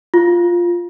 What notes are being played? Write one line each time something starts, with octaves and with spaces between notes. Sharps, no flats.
F4